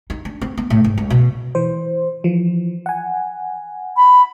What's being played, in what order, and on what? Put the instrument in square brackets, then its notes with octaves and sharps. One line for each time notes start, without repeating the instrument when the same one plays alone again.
[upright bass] D#4
D4
C4
B3
A2
G#2
C#2
B2
[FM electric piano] E3 C5
E3 F3
F#5 G#5
[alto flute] B5